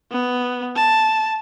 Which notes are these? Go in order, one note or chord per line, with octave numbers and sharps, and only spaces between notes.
B3
A5